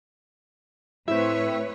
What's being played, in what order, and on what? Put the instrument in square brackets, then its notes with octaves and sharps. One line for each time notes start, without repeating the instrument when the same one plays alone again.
[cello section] A2 B4 C#5 [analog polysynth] C4 E5 [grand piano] E4